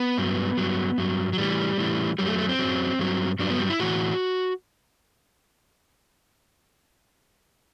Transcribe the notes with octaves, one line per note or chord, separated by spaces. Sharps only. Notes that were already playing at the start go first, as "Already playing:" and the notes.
Already playing: B3
G2 F#3
G2 F#3
G2 F#3
F#3
A2 E3 G3
A2 E3
F#2 F#3 G3
A3
A3
C4
F#2 F#3
G2 F#3
G2 F#3 D4
B3
G3
E4
A2 E3 F#4